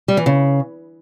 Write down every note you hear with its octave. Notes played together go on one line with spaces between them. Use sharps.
G3
E3
C#3